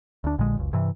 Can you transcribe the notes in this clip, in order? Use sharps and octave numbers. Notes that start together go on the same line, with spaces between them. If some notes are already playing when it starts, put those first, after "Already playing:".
D2 D4
A#1 A#2 D3 G#3
F#1 C#2
G2 C3 E3